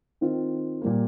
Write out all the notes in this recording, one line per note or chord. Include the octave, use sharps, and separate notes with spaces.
D#3 C4 F4
A#2 G3 A#3